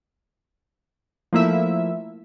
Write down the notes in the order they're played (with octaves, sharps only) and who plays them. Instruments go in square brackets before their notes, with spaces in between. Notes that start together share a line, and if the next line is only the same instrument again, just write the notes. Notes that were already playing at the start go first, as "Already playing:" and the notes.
[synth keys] F3 A3 A#3 E4 E5